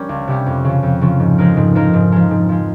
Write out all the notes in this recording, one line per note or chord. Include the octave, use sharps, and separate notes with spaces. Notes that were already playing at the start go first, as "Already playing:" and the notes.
Already playing: G3 C#4 A#4
C#2
C3 G3 C#4
F2
C#3 F3
F2
C#3 F3
G#2
F3 G#3 D#4 A#4
G#2
F3 G#3 D#4 A#4
G#2
F3 G#3
G#2
F3 G#3